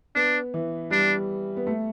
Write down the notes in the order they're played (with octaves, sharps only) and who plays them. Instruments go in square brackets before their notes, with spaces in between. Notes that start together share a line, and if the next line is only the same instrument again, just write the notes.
[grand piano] B3 [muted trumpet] D4
[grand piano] E3
[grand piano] G3 [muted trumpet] D4
[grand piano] B3
A3